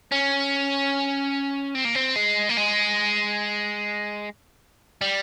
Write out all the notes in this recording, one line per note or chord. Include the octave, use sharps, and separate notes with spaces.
C#4
C4
A#3
C4
G#3
A#3
G#3
G3